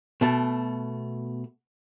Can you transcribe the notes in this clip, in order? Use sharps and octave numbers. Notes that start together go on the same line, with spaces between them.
B2 A3